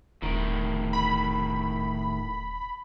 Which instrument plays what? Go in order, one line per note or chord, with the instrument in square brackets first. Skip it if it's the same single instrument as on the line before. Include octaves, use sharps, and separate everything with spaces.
[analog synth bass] D#1 [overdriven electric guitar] A2 D#3
[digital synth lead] B5